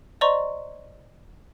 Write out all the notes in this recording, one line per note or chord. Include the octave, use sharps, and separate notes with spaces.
C5 D5 D#5 A#5 C6 C#6